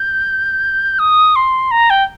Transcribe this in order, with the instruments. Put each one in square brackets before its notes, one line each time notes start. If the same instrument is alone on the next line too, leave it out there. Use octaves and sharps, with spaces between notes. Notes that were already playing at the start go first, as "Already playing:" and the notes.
Already playing: [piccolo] G6
D#6
C6
A#5
G5